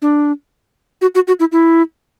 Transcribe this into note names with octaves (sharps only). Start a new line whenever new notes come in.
D4
F#4
F#4
F#4
E4
E4